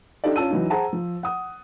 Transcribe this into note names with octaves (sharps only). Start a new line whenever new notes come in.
D4 D#4 G4 A4 D5
C#4 F4 A5 E6 D#7
E3 F#3 D#4
G#4 C5 F#5 A5 A#5
F3
F#5 D#6